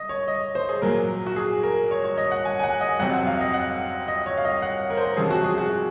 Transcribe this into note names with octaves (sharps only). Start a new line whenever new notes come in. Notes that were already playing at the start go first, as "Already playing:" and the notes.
Already playing: D#5
C#5
D#5
C5
G#4
A#2 F#3 A#3 A#4
F#4
G#4
A#4
C#5
C#5
D#5
F#5
G#5
G#5
F#5
D#5
F2 C3 F#3 C4 F#5
F#5
F5
D#5
F#5
D#5
C#5
F5
D#5
F#5
A#4
C5
A#4
C3 F3 G#3 C#4 G#4
F#4
G#4
F#4